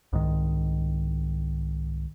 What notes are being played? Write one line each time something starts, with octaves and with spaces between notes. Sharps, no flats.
C2 G#2 D#3